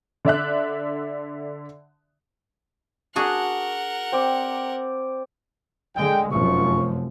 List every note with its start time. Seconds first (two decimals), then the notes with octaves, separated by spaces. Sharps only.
0.25 D3 D5 E5 F#6
3.16 D4 F#4 G#4 A#4 F#5
4.12 C4 C5 D5
5.96 D3 G#3 G5
6.32 F1 F#2 F3 F4 C#6